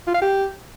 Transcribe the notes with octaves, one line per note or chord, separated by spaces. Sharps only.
F4
F5
G4